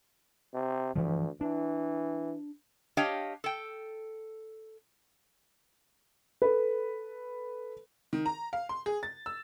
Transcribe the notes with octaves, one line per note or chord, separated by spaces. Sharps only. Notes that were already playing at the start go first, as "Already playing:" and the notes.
C3
D2 G2 E3 F3
E3 D4
D4 G4 C#5 D#5 F5 G5
A4 G5
A4 B4
D#3
A#5
F5
C6
G#4
A6
E6